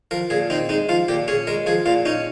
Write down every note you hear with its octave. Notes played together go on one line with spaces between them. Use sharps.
F3 A#4
A#2 G#4
C4 D#4
G#3 D#4
F3 F4
A#2 G4
C#4 G#4
G#3 A#4
F3 G#4
A#2 F4
C#4 D#4